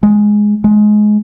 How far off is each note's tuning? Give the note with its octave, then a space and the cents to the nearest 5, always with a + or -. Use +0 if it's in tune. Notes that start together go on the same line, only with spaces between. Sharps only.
G#3 +0
G#3 +20